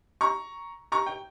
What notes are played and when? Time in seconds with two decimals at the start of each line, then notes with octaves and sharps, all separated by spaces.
0.21 A#5 C#6
0.92 A#5 C#6
1.06 G5